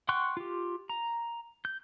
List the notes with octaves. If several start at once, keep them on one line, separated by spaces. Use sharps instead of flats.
F#5 G5 C6 C#6 F#6
F4 G4
A#5
G6